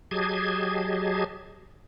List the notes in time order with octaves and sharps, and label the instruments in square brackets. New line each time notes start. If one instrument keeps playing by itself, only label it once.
[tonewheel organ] F#3 G4 G#4 D#5 A5 G#6